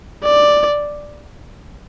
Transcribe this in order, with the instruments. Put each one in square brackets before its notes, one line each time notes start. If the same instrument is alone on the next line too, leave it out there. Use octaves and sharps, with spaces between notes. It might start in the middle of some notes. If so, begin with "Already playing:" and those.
[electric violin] D5